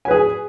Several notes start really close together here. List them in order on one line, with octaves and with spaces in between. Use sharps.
G#5 B4 G#4